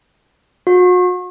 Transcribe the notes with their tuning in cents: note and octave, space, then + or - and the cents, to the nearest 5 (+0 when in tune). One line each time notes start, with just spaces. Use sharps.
F#4 -40